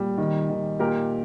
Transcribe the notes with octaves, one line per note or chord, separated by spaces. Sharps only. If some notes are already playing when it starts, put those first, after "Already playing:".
Already playing: A#2 G3
D#3
D#3
A#2 G4 A#4